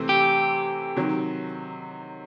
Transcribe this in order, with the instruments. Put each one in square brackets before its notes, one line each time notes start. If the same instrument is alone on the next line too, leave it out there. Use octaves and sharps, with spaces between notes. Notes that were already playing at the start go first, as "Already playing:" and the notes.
Already playing: [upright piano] C3 E3 A3 C4
[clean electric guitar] G4
[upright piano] C3 D#3 F#3